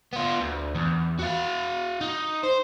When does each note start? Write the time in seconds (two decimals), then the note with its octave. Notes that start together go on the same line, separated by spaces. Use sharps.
0.13 B3 F4
0.41 D2
0.75 E2
1.19 F#4 F5
2.01 D#4
2.43 C5